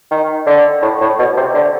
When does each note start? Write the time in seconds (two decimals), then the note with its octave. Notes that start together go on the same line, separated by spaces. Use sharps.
0.11 D#3
0.47 D3
0.82 A2
1.01 A2
1.19 B2
1.37 C3
1.54 D3